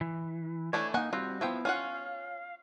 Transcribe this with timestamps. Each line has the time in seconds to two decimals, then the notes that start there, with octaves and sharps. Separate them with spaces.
0.01 E3
0.73 E3 A3 D4 C#5
0.94 A#3 D#4 F#5 G#5
1.13 G3 C4 F4 F#4
1.41 F3 B3 E4 F4 G5
1.65 C#4 F4 F5 F#5